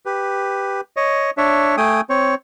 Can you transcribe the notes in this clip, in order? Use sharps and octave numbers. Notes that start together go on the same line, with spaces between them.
G4 B4
C#5 D#5
D4 C#5 E5
A3 G5 G#5 D#6
C4 C#5